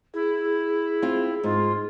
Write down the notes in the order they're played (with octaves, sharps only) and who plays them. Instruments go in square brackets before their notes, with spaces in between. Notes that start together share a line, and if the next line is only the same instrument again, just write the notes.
[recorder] E4 [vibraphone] G#4
[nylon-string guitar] C4 F4
[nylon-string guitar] G#2 [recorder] F4